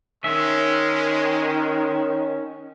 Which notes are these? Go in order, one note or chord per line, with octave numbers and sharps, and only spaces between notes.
D#3 G#3 C#4 E5